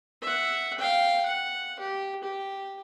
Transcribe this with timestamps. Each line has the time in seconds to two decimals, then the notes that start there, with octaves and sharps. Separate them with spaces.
0.22 E5 F#5
0.78 F5 G5
1.26 F#5
1.79 G4
2.23 G4